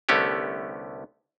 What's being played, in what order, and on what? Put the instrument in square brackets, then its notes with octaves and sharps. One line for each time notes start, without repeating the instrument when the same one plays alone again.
[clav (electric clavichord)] C2 D3 A3 B3 C#4 G4